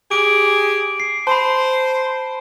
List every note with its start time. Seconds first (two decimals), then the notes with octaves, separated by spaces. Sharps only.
0.11 G4 G#4 D7
1.00 C7
1.27 C5 A5 B5